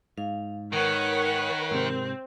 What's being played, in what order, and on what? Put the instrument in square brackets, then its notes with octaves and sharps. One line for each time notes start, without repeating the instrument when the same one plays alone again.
[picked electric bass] G#2 [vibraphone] F5
[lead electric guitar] D#3 [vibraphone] A#4 [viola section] B4 C#5 F#5
[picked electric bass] G#2 C3 [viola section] C4